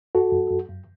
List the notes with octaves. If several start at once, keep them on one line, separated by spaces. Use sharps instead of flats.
F#2 F#4 A4
F#2
F#2
F#2